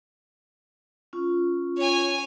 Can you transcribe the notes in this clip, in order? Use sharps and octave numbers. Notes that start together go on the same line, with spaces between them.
C#4 F4
C#5 G#5